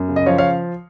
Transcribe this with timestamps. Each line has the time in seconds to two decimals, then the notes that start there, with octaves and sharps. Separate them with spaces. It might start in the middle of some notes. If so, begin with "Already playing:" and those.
Already playing: F#2
0.09 C#3
0.16 D#5
0.26 F3 C#5 F5
0.38 C#5 F5